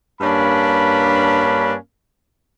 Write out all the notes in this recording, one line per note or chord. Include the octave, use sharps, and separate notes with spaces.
G2 A#3 C#4 D4 B5